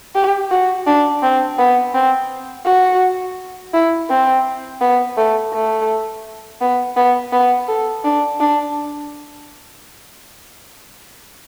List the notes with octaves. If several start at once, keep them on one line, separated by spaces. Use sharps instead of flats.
G4
F#4
D4
C4
B3
C4
F#4
E4
C4
B3
A3
A3
B3
B3
B3
A4
D4
D4